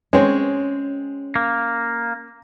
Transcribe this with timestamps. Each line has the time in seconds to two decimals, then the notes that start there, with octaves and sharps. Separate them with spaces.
0.13 G#3 C4 C#4 C#5
1.36 A#3